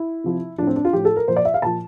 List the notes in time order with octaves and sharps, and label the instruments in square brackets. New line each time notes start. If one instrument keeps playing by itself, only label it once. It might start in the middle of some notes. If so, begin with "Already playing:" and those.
Already playing: [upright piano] E4
C3 F3
F3 D4
A2
C4
D4
F4
A2 F3 G4
A4
A#4
A#2 F3 C5
D5
E5
F5
A#2 F3 A5